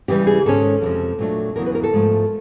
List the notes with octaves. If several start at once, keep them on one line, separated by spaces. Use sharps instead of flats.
C#3 E3 G3 G4
G#4
G#2 D#3 G#3 C#4 A4
F2 C3 F3
A#2 F#3 A3 D4
E2 C#3 F#3 A#4
B4
A#4
A4
G#2 F3 A3